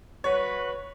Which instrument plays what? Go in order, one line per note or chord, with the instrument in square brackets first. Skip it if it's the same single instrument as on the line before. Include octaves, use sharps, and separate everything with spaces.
[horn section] F#4 B4 [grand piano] C#5